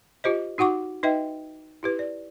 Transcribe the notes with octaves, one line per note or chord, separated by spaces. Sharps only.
F4 G4 C5 D#5
D#4 F#4 F#5 C#6 D6
D#4 B4 D#5 E5 G5
E4 G4 B4
D5